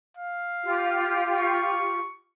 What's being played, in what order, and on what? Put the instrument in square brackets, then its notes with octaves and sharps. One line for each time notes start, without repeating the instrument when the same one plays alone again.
[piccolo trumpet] F5
[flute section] F4 G4
[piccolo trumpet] C#6